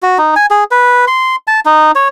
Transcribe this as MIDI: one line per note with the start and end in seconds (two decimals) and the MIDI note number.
0.02 0.18 66
0.18 0.34 63
0.36 0.46 80
0.50 0.64 68
0.71 1.05 71
1.07 1.36 84
1.47 1.60 81
1.65 1.92 63
1.95 2.08 73